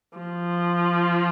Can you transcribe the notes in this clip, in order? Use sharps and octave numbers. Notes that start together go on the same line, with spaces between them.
F3